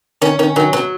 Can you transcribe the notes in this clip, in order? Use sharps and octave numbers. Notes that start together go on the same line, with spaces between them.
D#3 C#4
D#3 C#4
D#3 F#3
B2 F#3